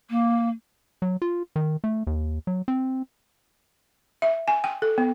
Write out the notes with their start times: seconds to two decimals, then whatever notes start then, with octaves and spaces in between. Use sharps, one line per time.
0.10 A#3
1.02 F#3
1.22 F4
1.56 D#3
1.84 A3
2.07 D#2
2.47 F#3
2.68 C4
4.22 E5
4.48 G#5
4.64 G5
4.82 A4
4.98 B3